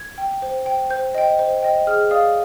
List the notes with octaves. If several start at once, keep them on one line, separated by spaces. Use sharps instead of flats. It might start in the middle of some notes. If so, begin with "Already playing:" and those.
Already playing: G#6
G5
C5
G5
C5 G6
D#5 G5
C5
D#5 G5
G#4 F6
D5 F5 D#6